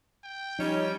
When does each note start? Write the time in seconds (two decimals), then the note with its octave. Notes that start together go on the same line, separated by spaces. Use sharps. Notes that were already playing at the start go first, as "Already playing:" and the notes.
0.24 G5
0.59 F3 G3 C#4 D#4